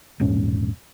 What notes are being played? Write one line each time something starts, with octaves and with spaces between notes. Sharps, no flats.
E1 A#1 G#2 C#4